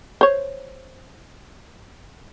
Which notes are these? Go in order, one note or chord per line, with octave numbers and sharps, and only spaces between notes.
C5 C#5